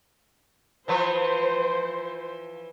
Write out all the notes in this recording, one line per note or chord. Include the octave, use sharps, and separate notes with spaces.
E3 F3 B4 C5